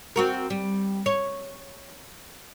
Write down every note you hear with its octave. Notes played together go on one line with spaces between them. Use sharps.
C4 F#4 A#4
G3
C#5